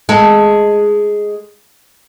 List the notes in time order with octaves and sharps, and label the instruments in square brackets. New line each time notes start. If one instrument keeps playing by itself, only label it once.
[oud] G#3 A4